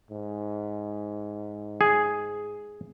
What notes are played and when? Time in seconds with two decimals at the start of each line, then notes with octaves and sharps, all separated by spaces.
0.10 G#2
1.81 G#4